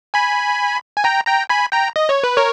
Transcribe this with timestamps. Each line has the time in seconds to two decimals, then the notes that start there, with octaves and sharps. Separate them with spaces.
0.14 G#5 B5
0.97 G#5
1.04 G5 A#5
1.27 G5 A#5
1.49 G#5 B5
1.72 G5 A#5
1.96 D#5
2.09 C#5
2.23 B4
2.37 A#4 C#5